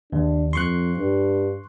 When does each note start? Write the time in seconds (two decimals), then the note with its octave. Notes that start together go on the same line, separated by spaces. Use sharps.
0.12 D#2 D4
0.53 F2 C6 C#6 F#6
0.97 G2